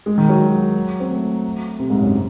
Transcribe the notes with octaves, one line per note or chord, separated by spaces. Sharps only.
G#3
D#3
F#3
C4
A3
C3
G#2
F#2